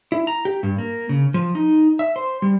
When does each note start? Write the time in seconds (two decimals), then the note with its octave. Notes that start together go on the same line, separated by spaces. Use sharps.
0.12 E4
0.27 A#5
0.45 G4
0.63 G2
0.78 A#3
1.09 C#3
1.34 F3
1.55 D#4
1.99 E5
2.16 C5
2.42 G3